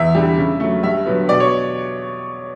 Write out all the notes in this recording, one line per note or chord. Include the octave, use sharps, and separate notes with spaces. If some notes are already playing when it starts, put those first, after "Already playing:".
Already playing: E2 E5
D3 G3
C#3
F#3 A3
G2 E5
D3 F#3 B3
B2 D5
C#5